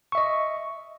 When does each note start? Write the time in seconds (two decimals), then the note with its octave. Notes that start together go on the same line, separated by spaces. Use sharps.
0.12 C#6
0.15 E5
0.18 D#5